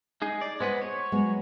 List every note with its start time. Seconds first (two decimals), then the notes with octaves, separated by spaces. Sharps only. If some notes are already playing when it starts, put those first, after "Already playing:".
0.22 G#3 D#4 G#4
0.41 D5
0.60 G#3 B3 B4 C5
0.82 C#5
1.12 F#3 G#3 B3